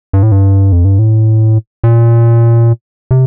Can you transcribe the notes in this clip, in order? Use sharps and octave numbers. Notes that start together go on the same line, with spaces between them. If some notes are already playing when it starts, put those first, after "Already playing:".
G2
A2
G2
F2
G2
A2
A#2
C3